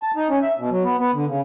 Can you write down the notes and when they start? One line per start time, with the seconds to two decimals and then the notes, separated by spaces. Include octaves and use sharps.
0.03 A5
0.16 D#4
0.30 C#4
0.42 E5
0.58 B2
0.71 F#3
0.83 B3
0.98 B3
1.14 D3
1.27 C#3